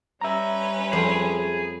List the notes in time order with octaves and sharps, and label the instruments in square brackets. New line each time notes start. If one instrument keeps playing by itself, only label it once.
[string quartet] G3 C#4 B4 [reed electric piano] E5 A#5
[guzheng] F2 [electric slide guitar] G#4